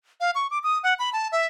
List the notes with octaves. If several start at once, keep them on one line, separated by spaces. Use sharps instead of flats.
F5
C#6
D6
D#6
F#5
B5
A5
E5